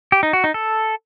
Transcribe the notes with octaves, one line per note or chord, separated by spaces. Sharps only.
G4
D#4
F#4
D#4
A4